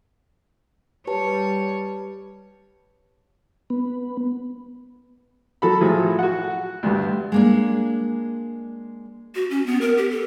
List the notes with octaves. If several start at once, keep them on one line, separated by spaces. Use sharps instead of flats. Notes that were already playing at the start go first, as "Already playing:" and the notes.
G3 G4 B4 C#5 A5
B3
F#3 A4 B5
A2 F3 F#3 G#4
F#4 F#5
D2 G2
G#3 A#3 D4
F#4
C#4
B3
A#4
G4
A4